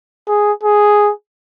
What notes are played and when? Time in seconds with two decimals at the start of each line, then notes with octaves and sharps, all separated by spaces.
0.28 G#4
0.63 G#4